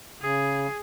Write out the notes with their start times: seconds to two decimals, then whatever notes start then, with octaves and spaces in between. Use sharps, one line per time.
0.21 C#3 G#4